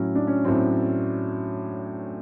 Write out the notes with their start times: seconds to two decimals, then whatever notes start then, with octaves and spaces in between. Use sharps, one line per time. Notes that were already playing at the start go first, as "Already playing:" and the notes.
Already playing: A2 F#3 C#4
0.15 D4
0.27 C#4
0.45 A2 F#3 C4